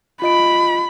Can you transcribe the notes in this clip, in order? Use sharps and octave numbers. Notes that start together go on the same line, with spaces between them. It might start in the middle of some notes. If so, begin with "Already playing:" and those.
F4 D#5 B5 D7